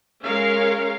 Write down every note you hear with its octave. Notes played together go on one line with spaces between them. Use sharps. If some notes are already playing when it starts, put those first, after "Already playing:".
G#3 C#4 A#4 F5